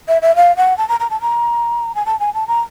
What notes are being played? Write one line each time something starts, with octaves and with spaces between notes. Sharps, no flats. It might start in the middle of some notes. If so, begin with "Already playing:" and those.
E5
E5
F5
F#5
A5
A#5
A#5
A5
A#5
G#5
A5
G#5
A5
A#5